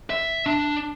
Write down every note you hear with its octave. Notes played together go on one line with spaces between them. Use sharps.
E5
D4